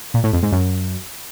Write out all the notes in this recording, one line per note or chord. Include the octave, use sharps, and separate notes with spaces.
A#2
A2
F2
G#2
F#2